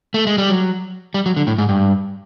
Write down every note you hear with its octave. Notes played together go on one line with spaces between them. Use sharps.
A3
G#3
G3
F#3
G3
F#3
D3
A2
G#2
G2